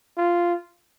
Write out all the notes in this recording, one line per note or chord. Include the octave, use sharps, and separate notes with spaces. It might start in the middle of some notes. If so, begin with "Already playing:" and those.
F4